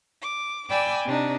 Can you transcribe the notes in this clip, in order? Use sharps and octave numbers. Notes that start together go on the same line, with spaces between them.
D6
D5 G5 G#5 B5 D6 E6
C3 D4 D#4